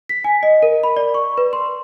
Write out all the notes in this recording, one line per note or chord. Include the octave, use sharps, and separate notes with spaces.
B6
G#5
D#5
A#4
B5
D5
C#6
B4
C6